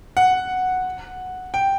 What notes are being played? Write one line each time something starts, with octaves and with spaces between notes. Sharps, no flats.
F#5
G5